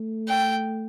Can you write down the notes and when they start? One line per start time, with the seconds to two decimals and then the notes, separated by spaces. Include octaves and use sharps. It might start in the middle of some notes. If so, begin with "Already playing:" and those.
Already playing: A3
0.28 G5